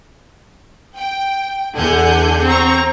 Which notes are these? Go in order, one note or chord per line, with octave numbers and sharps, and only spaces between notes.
G5
E2 D3 F#5 G#5 G6
C4 A#5 C#6